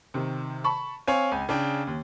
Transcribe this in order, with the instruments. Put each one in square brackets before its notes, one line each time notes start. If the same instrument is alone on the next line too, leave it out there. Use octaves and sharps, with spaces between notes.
[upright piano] C3 D#3
A5 B5 C#6
[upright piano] C4 [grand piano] C#5 F5 G#5
[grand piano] C#2 [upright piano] G#5
[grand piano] C#3 D4 G5
[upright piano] D#2